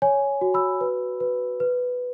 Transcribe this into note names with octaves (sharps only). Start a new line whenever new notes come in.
C#5 G#5
F#4
B5 E6
B4
B4
B4